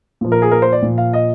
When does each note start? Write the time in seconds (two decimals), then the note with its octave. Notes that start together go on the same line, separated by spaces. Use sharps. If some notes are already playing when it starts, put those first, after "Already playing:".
0.21 A#2 F3
0.32 A#4
0.42 G#4
0.51 A#4
0.62 C5
0.73 D5
0.82 A#2 F3
0.98 F5
1.13 D#5